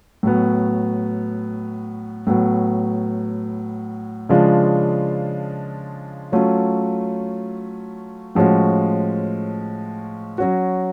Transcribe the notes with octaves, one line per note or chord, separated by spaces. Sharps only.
A2 F#3 B3
A2 F#3 B3
C#3 F3 G#3 D4 F4
F#3 A3 C#4 F4
A2 F3 G#3 C#4 F#4
F#3 C#4 F#4